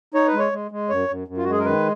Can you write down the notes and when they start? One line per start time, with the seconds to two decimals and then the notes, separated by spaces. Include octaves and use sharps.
0.14 D#4 C#5
0.27 B4
0.33 G#3
0.39 C#5
0.52 G#3
0.71 G#3
0.89 F#2 C#5
1.08 F#2
1.28 F#2
1.37 F4
1.44 F#4
1.47 G#3 G#4
1.58 A#4
1.65 D#3 B4